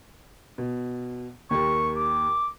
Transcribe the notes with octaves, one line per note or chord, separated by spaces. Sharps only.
B2
D#2 G4 A#4 C#6
D6